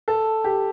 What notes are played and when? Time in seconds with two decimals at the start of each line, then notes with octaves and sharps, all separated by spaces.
0.08 A4
0.44 G4